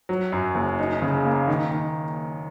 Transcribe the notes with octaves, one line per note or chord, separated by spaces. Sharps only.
F#3
F#2
F#1
D#4
C#3
A#3
D#3
D#3